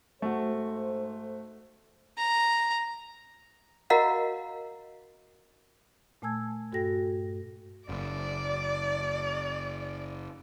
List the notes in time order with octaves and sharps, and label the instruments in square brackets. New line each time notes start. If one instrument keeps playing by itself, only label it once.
[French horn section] G#2 A4 C5 [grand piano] A3 F#4
[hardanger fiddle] A#5
[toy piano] F#4 A#4 D#5 F5 F#5 A#5
[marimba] A#2 A3 G#5 A5 E6 G#6
G2 F#4 A4 G5 A#6
[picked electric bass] F#1 [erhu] D5